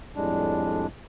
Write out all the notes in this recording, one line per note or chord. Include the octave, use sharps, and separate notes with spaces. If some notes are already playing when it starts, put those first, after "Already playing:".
F2 A2 G3 G#3 D4